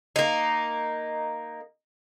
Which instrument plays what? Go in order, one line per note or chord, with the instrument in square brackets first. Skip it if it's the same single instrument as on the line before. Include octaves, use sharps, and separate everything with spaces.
[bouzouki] A#3 D#4